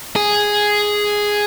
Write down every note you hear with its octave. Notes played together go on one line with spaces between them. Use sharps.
G#4